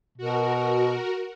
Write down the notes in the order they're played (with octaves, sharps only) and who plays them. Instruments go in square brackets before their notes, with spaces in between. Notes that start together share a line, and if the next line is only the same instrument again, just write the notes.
[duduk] B2 [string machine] F#4 A#4